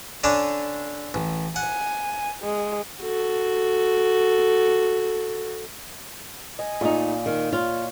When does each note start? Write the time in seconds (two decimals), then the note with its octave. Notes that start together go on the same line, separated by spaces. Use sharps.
0.24 D3 C#4 D4
1.14 A1
1.56 F#5 G#5
2.43 G#3
3.01 F#4 A4
6.59 D#5 G#5
6.81 A#2 A3 D#4
7.26 D#3
7.53 F4 C#5